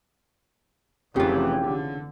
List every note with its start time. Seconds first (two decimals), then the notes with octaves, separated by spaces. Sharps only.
1.16 F1 C#3 E3 F4 G4
1.62 D3